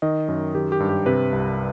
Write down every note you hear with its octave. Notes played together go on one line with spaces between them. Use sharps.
D#3 D#5
F#2
D#3 G4
G4
G2
G4
C3 B4
C2